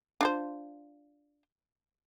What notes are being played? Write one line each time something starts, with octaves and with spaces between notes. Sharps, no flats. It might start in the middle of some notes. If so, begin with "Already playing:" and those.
D4 F4 C5